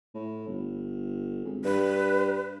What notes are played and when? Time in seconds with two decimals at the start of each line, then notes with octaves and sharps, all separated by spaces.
0.14 A2
0.47 G1
1.45 G#1
1.65 G2 B4